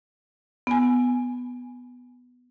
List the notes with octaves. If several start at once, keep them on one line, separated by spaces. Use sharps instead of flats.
B3 G#5